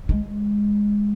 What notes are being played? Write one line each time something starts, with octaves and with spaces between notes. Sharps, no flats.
G#3